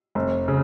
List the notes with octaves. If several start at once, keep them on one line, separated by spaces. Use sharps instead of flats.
F1
C#3